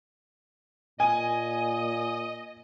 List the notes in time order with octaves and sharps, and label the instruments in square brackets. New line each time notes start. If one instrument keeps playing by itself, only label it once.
[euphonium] A#2 [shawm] D#5 [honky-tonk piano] G#5